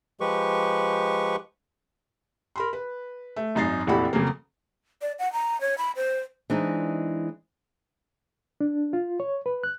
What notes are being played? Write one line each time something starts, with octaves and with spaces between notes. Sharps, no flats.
F3 G#3 G4 B4 C#6
A#4 B5 C6
B4
A3
G#1 F#2 D#4 A#5 A6 C7
F1 A#1 E3 F#4 G4 B5
F2 C#3 F#3 A#3
D5
F#5
A#5
C#5
B5
C5
E3 G#3 C4 D4 D#4
D4
F4
C#5
B4
F#6